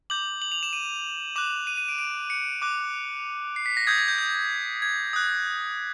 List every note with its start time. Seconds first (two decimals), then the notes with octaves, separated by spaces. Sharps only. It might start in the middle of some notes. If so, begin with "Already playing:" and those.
0.10 D6 G6 F#7
0.42 F#7
0.52 F7
0.63 E7
0.73 D#7
1.36 D6 F#6 E7
1.67 D#7
1.77 D#7
1.88 D7
1.98 D7
2.30 C#7
2.62 D6 F#6
3.56 C7
3.66 B6
3.77 A#6
3.87 D#6 G6 G#6
3.98 G#6
4.08 G6
4.18 G6
4.82 G#6
5.13 D#6 F#6